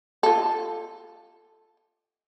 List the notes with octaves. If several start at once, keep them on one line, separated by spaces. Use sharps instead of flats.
F4 A4